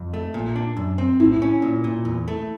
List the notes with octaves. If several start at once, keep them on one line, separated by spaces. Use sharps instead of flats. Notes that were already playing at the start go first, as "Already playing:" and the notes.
Already playing: F2
A3
A#2
D4
F#2
C4
A2 E4
C#4
A#2
A#2
E2
A3